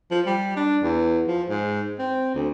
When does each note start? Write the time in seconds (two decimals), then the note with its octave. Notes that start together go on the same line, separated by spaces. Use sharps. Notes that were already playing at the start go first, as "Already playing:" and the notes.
0.11 F3
0.26 G3
0.56 D4
0.83 E2
1.28 F3
1.50 G#2
1.99 C4
2.35 D2